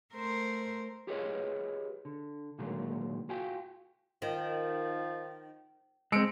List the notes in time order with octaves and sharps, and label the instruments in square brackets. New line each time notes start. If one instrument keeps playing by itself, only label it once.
[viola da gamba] A3 A#4 C5
[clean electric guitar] F4 G4 G#4 B4 C#5 D#5
D3
A#2 D3 D#3 F#3 G#3 A#3
F4 F#4 F5 G5 G#5
[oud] D#3 [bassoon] F3
[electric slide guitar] G#3 C4 [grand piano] E6 C#7 D7